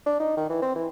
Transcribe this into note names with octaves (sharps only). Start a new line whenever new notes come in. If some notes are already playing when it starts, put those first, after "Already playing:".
D4
D#4
D#3
E3
C4
E3